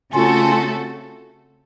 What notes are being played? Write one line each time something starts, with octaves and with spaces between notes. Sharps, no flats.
C#3 A3 C4 C#4 F4 F#4 A4